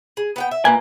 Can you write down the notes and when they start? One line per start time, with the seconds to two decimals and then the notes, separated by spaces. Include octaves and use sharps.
0.17 G#4
0.36 B3 F#5 G5
0.51 E5
0.65 A#2 A#3 B4 G#5